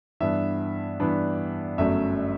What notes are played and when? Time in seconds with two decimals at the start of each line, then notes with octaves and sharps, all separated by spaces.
0.20 G2 E3 B3 D4 E5
1.00 G2 E3 B3 D4
1.78 G1 F#2 F#3 A3 E5